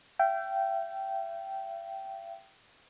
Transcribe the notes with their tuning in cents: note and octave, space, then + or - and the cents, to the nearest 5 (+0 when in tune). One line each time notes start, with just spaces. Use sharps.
E5 +40 G5 -15